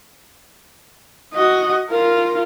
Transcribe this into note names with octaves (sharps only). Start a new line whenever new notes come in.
F#4 D#5
F4 A#4